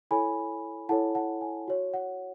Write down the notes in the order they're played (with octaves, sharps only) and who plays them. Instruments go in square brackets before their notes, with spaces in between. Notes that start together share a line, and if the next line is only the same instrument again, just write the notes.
[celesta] E4 A4 C#5 G#5 B5
E4 A4 C#5 F#5 A5
F#5 A5
G#5
F#4 C#5
F#5